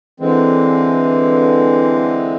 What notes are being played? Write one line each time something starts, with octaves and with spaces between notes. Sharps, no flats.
D3 E3 G#3 C4